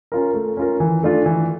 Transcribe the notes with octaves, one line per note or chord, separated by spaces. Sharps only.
C#4 F4 A#4
A3
C#4 F4 A#4
E3
A3 D4 F4
E3